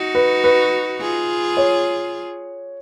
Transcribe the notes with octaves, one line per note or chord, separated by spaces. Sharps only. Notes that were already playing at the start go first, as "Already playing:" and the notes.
Already playing: D#4 F#4
B4
B4
F4 G#4
C#5